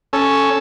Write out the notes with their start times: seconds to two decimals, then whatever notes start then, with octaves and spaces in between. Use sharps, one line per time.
0.13 C#4 A4